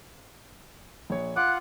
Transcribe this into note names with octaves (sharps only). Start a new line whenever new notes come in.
A#1 C#5
F4 F#5 D6 F#6